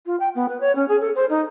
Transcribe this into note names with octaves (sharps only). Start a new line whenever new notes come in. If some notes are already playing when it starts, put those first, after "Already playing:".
F4
G5
B3
B4
C#5
C#4
G#4
A4
C5
D#4